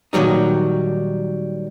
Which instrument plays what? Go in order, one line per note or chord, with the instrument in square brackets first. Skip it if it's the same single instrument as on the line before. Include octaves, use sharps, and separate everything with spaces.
[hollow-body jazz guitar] A#2 D#3 F#3 G3 D#4